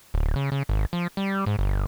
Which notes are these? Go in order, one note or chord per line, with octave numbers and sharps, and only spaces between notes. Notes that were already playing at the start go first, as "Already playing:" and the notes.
D1
C#3
C#3
G#1
F3
G3
G#2
G1